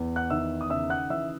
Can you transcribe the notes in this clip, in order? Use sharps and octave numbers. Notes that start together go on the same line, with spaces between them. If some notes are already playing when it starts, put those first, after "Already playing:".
Already playing: E2
F#5 F#6
D#3 E5 E6
D#6
C#3 E5 E6
F#5 F#6
E3 E5 E6